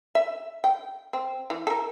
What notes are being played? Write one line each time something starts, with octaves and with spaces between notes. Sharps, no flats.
E5
G5
C4
E3
A4 A#4